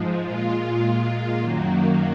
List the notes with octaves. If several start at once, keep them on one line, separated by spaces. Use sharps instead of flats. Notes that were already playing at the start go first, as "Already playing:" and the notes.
Already playing: G#2 F3 G#3
A#2 G#3 F4
F#2 D#3 F#3 A#3